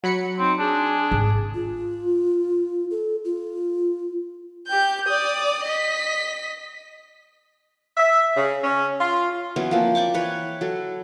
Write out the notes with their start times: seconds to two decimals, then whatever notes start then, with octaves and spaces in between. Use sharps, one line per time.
0.04 F#3 F#5 B5 C#7
0.39 C4 D#4
0.59 D4 G#4
1.11 G#1
1.54 F4
2.91 A4
3.25 F4
4.68 G4 G6
5.08 D5 D#6
5.65 D#5 B6
7.96 E5
8.37 C#3
8.64 C#4
9.01 F4
9.56 E3 F#3 B3 C#4
9.71 F3 A#3 C4
9.95 D5 G5 C#6 D6
10.14 E3 B4 C#5
10.61 F#3 A4